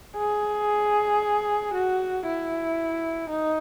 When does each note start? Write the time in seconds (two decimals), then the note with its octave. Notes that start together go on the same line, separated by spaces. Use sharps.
0.17 G#4
1.74 F#4
2.26 E4
3.30 D#4